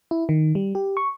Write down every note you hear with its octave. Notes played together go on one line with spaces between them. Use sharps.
E4
D#3
G3
G4
C#6